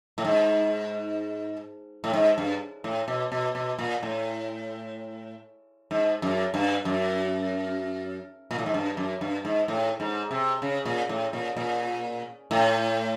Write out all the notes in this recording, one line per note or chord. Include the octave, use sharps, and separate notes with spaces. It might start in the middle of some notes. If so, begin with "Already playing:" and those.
A2
G#2
A2
G#2
G2
A2
B2
B2
B2
A#2
A2
G#2
F#2
G2
F#2
A#2
A2
G#2
G2
F#2
G2
G#2
A2
G#2
C3
C#3
A#2
A2
A#2
A#2
A2